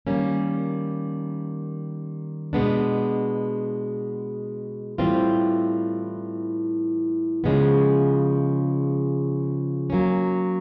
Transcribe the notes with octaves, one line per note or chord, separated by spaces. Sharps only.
D#3 G3 A#3 C#4
B2 G#3 B3 D4
A2 E3 G3 C4 F4
C#3 F3 G#3 B3
F#3 A#3 C#4